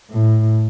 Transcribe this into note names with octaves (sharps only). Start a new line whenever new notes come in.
A2